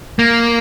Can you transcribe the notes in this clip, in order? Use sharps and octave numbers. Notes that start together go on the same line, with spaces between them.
A#3